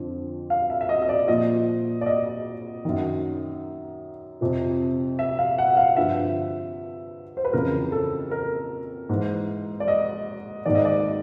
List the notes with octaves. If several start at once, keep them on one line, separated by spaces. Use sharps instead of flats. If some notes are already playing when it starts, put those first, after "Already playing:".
Already playing: F2 D3 F3
F5
E5
E5
D#5
D#5
D5
A#2 F3 D#5
D5
D#5
F#2 D#3
F2 C3 F3
E5
F5
F#5
F5
G2 D3 F3 E5
C5
B4
F2 C#3 E3 A#4
A4
A#4
G#2 E3
D5
D#5
G#2 D#3 D5
D#5
D5